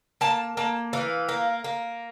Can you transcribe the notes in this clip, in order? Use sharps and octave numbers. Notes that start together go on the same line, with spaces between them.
A#3 A5
A#3 A5
E3 F5
A#3
A#3